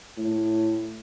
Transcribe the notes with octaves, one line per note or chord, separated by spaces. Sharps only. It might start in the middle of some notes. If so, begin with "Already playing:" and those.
A2